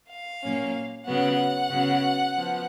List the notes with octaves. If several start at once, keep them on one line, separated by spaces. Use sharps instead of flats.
F5
A#2 F#3 A#3 C#4
C#3 F#3 B3 F#5
C#3 F#3 B3
F3 B3